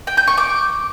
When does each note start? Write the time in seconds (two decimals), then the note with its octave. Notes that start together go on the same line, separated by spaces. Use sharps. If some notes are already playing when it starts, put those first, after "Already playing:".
0.07 G5
0.17 G6
0.27 C#6
0.38 D6